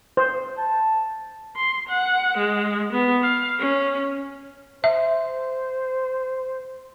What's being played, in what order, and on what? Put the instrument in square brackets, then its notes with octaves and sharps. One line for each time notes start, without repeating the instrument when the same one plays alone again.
[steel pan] C5
[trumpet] A5
[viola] C6
F#5
G#3
B3
F5
C#4
[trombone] C5 [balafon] E5